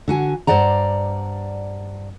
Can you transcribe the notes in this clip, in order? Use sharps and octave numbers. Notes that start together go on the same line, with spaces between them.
D3 F#4 G#5
G2 C5 D5 F#5 A#5